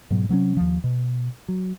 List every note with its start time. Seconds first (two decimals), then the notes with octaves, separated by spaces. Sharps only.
0.10 G#2 B2 F#3
0.29 C3 F#3 A3 C#4
0.57 D#2 F3
0.84 B2
1.48 F#3